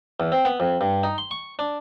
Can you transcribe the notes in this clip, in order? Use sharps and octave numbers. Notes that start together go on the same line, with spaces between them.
E2
C4
B3
F2
G2
D#4
C6
C#6
D4